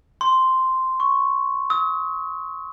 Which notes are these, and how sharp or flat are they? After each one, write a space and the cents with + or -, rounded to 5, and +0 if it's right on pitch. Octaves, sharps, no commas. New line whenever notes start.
C6 -5
C#6 +0
D#6 +45